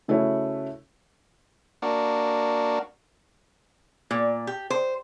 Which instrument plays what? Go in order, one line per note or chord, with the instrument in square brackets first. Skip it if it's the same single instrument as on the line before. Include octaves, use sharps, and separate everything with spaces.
[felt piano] C#3 A3 E4 F#4 C#5
[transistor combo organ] A#3 D4 F#4
[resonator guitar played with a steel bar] A#2
G4
C5